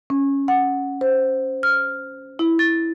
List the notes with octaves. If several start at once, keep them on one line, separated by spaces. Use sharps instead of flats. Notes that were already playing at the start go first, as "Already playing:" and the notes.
C#4
F#5
C5
F6
E4
A6